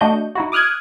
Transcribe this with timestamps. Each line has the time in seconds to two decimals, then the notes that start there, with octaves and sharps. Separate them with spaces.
0.01 A3 D4 F#4 D#5 G6
0.35 D#4 E4 F#4
0.52 D6 D#6 F6 F#6 G#6